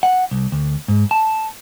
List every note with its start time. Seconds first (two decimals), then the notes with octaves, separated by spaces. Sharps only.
0.03 F#5
0.31 C2
0.52 D2
0.88 G#2
1.11 A5